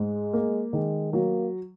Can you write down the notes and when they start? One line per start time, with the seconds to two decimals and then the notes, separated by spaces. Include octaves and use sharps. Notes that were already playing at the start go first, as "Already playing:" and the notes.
Already playing: G#2 G#3
0.33 A#3
0.73 D#3 G#3
1.13 F#3 A#3